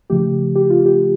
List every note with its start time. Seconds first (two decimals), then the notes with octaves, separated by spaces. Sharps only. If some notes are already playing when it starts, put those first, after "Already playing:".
0.10 C#3 F3 A3 G4
0.56 G4
0.70 F4
0.86 G4